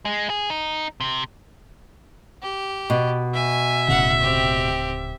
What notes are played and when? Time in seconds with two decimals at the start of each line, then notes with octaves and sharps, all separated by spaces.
0.05 G#3
0.30 G#4
0.50 D#4
1.00 C3
2.42 G4
2.90 B2
3.34 E5 G#5
3.88 D1 A2 C#3 F#5
4.22 C4 G4